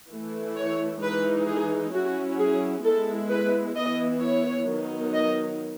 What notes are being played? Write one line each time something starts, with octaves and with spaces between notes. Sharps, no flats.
E3 A3 E4
C#5
E3 G#3 D#4 B4
G#4
F#3 C#4 E4 F#4
G#4
G#3 B3 E4 A4
B4
E3 B3 E4 D#5
C#5
D#3 F#3 B3 D#4
D#5